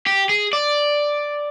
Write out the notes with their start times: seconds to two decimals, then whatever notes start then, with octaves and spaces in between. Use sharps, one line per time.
0.07 G4
0.29 G#4
0.53 D5